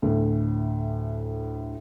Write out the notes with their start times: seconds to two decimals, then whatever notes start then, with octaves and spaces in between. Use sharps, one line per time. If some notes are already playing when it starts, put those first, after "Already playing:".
0.02 D2 A2